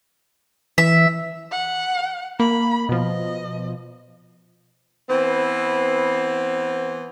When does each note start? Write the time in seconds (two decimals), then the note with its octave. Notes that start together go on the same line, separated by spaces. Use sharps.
0.78 E3 E5
1.51 F#5
2.40 A#3 B5
2.89 B2 F3 D#5
5.09 E3 B3 C4